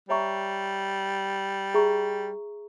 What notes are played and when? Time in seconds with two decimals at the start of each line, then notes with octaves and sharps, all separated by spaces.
0.09 G3 C#5 E5 A#5 C#6
1.74 G#4 E5 A#5 C#6